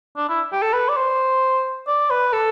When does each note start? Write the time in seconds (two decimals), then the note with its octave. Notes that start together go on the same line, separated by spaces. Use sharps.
0.16 D4
0.29 E4
0.52 G4
0.62 A4
0.73 B4
0.89 D5
0.96 C5
1.87 D5
2.10 B4
2.33 A4